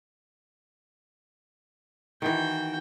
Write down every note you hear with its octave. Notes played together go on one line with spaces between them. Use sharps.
D#3 E3 F#4 G5